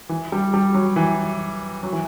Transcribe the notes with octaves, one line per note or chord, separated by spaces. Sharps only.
E3
G3
G3
F#3
E3
F#3
E3